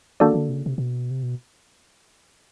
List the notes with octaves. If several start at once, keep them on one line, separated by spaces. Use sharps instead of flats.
D#3 A#3 D4 F#4 A4 D5
D#3
D3
C3
C#3
C3
B2
C3
B2